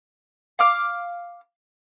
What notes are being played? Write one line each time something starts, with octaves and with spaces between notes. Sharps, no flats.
F5 D6 F6